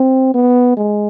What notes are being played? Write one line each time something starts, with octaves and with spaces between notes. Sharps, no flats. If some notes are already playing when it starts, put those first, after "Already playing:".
Already playing: C4
B3
G#3